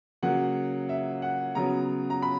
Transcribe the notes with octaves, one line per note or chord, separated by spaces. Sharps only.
C#3 F#3 A#3 F#5
E5
F#5
C#3 F#3 B3 A#5
A#5
B5